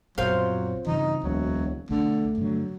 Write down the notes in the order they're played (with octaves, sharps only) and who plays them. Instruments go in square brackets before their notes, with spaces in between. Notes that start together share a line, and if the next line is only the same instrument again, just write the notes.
[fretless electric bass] A#1 F#2 B2 [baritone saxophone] F#3 [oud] C4 F4
[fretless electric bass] G2 C#3 E3 [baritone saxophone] D#4
[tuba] E1 [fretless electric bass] D2 [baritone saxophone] F#3
[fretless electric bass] B1 [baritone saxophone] D3 [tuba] A3
[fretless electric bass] G2 D3 [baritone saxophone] F#3